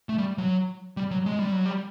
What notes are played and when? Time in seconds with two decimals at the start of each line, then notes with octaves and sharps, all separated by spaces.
0.09 A3
0.18 G3
0.38 F#3
0.97 G3
1.11 F#3
1.26 G#3
1.39 G3
1.52 F#3
1.66 G3